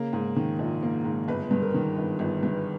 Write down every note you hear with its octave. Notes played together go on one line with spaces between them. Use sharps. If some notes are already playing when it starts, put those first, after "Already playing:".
Already playing: C#3 A#3
G#2
D#3
A#1
A#3
G#2
G1 B4
G2
A#4
D#3
G1
G1
G2